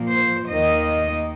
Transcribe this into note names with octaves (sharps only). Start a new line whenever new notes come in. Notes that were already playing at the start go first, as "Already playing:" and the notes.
Already playing: A#2 F3 A#3
C5
D#2 D#3 A#3 D#5